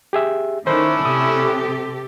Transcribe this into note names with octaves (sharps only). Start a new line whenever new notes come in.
G4 G#4 E5
D#3 A3 C#4 D4 E4 C5
C3 G4 A4 D#6